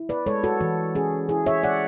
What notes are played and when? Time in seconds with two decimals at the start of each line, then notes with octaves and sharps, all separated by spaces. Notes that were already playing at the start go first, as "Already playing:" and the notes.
Already playing: E4
0.09 B4 D5
0.26 G#3 A4 C#5
0.44 F#4 A4
0.61 E3 F#4
0.95 C#4 G#4
1.29 E4 G#4
1.46 C#5 E5
1.63 G#3 D5 F#5